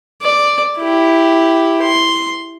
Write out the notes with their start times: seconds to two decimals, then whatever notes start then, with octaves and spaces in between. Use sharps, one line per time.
0.22 D5
0.79 E4 G4
1.83 C6